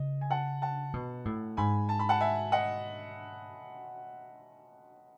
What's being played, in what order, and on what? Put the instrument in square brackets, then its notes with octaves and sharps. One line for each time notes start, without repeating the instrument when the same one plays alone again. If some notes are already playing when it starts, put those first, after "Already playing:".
Already playing: [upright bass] C#3 [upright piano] D#5
[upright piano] G#5
F#5 A5
F#5 A5
[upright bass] B2
A2
[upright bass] G#2 [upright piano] G#5 B5
[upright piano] A5
B5
F#5 A5
E5 G#5
D#5 F#5